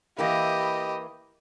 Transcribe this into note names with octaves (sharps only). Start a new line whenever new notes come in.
E3 A#3 E4 G4 D#5